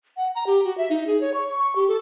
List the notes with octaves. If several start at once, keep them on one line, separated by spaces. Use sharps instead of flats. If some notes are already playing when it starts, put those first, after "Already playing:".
F#5
A#5
G4
F#4
E5
D#4
G#4
C#5
C#6
C#6
G4
A4